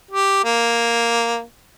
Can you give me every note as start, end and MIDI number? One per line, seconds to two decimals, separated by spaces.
0.11 0.43 67
0.44 1.42 58